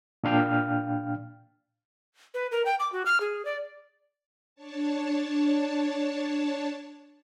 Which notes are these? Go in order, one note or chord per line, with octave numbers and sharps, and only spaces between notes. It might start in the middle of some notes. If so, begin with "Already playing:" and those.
A#2 D4 F5 G5 F6
B4
A#4
G5
D6
F#4
F6
G#4
D5
D4 C#5 A5